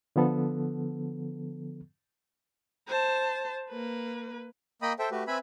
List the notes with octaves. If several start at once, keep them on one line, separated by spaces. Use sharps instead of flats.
D3 F3 B3 A4
C5 A5
A#3 B4
A#3 D#5 G5 B5 D#6
A4 C5 E5 G5
A3 F#4 G4 B4
C4 B4 E5 G#5 B5